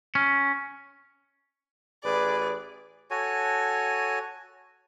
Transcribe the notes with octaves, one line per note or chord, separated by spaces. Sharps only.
C#4
A1 G#4 B4 D5
F#4 A4 C#5 G#5